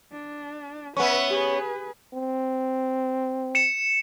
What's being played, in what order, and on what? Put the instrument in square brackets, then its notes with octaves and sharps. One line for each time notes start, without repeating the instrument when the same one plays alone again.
[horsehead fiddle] D4
[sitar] B3 C#4 [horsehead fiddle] B4 E5 [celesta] F#5 C#6
[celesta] G4 [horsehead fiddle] G#4 B4
[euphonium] C4
[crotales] C#7 E7